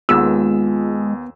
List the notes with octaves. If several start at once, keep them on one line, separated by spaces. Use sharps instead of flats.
D#2 G#3 B3 F4 E6